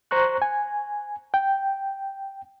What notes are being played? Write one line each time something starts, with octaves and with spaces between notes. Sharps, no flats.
C5 A#5 C#6 F#6
G#5
G5